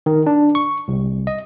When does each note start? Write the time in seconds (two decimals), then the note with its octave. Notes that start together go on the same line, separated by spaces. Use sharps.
0.06 D#3
0.27 D4
0.55 C#6
0.88 C2
1.27 D#5